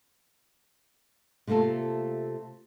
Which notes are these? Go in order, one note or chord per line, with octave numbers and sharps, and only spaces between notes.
C3 A3 A#3 F4 A4